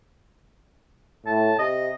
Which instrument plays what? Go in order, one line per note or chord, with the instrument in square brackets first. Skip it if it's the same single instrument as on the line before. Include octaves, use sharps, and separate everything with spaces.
[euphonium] A2 [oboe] A5
[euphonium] C3 [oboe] D#5